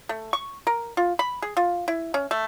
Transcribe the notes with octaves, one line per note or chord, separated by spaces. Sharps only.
A3
C#6
A#4
F4
B5
G#4
F4
E4
C#4
A3